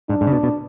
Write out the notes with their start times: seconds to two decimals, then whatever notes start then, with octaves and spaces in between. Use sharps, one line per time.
0.09 G#2 D4
0.21 G#2
0.27 C#3
0.32 B2
0.43 B2